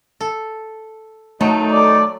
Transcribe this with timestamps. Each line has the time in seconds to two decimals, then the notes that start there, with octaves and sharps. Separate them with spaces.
0.21 A4
1.41 D2 D#3 F#3 A3 D#4
1.72 D5